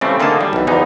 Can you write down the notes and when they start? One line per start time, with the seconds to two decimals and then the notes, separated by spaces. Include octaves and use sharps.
0.01 C#3 E3 G3 A3 C4
0.20 D3 A#3 D#4 G#4 A5
0.41 G3
0.53 B1 E3
0.67 E2 E3 F3 D#4